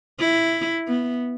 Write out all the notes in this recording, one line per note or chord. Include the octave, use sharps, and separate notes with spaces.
E4
B3